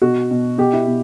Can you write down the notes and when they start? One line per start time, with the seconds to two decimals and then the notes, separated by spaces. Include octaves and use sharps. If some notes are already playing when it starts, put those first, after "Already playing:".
0.02 B2 F#4
0.31 B2
0.58 B2 G4
0.73 E4
0.87 B2